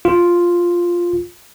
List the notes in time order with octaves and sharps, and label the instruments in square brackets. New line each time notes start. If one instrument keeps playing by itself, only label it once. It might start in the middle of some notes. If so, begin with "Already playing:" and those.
[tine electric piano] F4